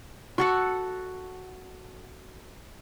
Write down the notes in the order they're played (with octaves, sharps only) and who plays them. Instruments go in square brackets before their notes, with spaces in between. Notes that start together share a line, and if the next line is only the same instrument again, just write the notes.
[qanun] F#4 A4 F#5